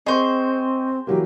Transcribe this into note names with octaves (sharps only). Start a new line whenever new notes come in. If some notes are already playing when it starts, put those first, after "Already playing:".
C4 G#4 C5 D#5 C#6
E3 F#3 A#3 G4